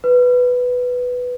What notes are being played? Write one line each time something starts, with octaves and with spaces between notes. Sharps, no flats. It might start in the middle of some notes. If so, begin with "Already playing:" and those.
B4